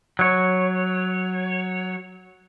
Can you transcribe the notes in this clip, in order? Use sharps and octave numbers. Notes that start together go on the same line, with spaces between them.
F#3 C#5